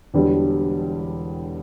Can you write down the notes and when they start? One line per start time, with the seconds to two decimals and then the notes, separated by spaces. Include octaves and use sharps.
0.14 E1 E2 D3 G3